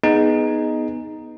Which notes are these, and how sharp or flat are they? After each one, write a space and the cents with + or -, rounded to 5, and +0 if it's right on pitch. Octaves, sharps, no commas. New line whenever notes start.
B3 -5 D#4 +0 G#4 +0